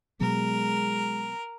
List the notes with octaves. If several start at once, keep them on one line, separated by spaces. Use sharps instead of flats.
B2 F#3 G#3 B3 A#4